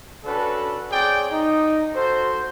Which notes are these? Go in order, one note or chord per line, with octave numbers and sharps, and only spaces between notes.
C#4 D4 F#4 A4 B4
C4 G#4 C#5 D5 G5
D#4
F#4 A4 C5